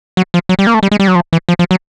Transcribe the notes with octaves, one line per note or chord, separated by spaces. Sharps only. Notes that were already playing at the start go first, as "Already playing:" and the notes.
F#3
F3
F#3
G3
A#3
A3
G3
G#3
G3
F#3
F3
E3
F3
F3
F#3